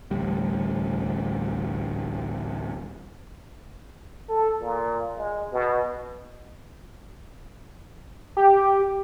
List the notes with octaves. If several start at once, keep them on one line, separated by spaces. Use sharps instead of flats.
A1 D2 G3
A4
A#2
G#3
B2
G4